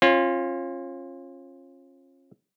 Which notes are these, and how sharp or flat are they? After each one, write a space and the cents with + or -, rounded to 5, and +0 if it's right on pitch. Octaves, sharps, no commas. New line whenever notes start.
C#4 -40 F4 +0